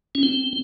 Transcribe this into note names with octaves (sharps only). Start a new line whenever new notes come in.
C#4
C4